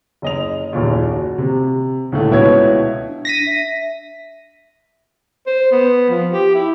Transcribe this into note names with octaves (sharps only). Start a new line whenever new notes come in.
F#1 D#5 F7
F#1 D#2 A#2
F#4
C3
C#2 A2 D3 A3
C#2 B2 E4 C#5 G#6
D4
A#6 B6 D#7
E5
C5
B3
F3
G4
E4